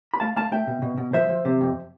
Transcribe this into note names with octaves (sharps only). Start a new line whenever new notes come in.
B5
A3 F5 A5
A3 F5 A5
A3 E5 G5
B2
B2
B2
F3 C5 E5
F3
C3
F2